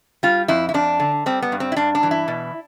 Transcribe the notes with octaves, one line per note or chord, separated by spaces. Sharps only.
G3 F4
F2 E4
E4
F2 D4
D3
G3 C4
B3
G2
C4
E4
G2 D4
D4
E3
E4
B2